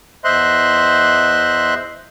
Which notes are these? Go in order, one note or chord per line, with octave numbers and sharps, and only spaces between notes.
E2 C5 D#5 E5 C6 F#6